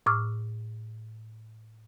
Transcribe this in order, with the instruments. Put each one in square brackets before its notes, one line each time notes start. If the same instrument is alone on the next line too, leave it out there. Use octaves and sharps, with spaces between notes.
[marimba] A2 C#6 D6 E6 F6